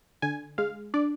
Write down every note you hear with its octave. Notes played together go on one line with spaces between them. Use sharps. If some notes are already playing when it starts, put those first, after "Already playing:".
D3 G#5
G#3 F5
D4 D5